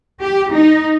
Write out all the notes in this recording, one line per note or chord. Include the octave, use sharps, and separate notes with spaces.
G4
D#4